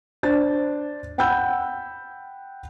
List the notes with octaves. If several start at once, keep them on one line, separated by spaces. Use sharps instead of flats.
D4 C5 A6
F#5 G5 B5 E6 G6